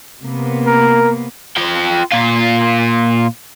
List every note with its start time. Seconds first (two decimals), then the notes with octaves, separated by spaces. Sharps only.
0.22 C3 A#3 B3
0.67 A#4
1.57 F4 G5
2.12 A#2 F4